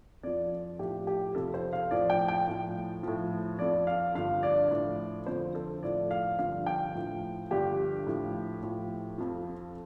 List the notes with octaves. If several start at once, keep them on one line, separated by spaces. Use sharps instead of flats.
F2 F3 D5
A2 F3 G4
G4
F2 C3 F3 A4
C5
F5
A2 F3 D5
G5
G5
A2 F3
A2 F3
F2 F3 D5
F5
G2 D3 F3 F5
D5
A2 F3
F2 D3 F3 C5
A4
A2 F3 D5
F5
G2 D3 F3 F5
G5
A2 F3
G2 D3 F3 G4
A2 F3
A2 F3
F2 F3